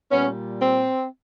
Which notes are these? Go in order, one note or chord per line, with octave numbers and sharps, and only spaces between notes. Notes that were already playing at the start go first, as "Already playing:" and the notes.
A#2 G3 B3 C#4
C4